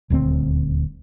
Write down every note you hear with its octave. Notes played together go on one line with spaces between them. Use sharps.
D#1 D2 A3 C4